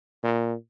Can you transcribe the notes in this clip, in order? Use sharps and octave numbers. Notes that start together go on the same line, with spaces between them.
A#2